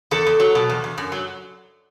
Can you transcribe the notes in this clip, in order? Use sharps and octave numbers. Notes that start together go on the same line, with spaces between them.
E2 A4
E2
F#3
B2
E2
E2
F#2
F#3